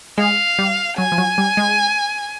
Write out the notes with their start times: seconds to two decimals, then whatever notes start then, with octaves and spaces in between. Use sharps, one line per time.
0.18 G#3 F5
0.59 G3
0.98 F#3 G#5
1.12 F3
1.18 F#3
1.38 G3
1.57 G#3